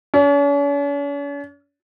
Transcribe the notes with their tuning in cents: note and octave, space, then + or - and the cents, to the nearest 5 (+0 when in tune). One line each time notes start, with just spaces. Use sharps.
C#4 +45